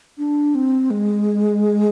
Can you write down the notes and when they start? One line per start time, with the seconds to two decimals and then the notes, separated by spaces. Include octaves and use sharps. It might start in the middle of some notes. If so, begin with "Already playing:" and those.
0.18 D4
0.55 C4
0.90 G#3